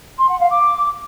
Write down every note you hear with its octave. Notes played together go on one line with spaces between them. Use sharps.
C6
F#5
F5
D6